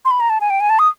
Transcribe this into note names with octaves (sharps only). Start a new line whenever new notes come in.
C6
B5
A#5
A5
G#5
G5
G#5
A5
D#6